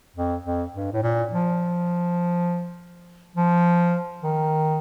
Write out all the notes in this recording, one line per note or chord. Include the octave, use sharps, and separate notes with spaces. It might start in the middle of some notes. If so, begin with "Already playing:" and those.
F2
F2
G2
A2
A#2
F3
F3
D#3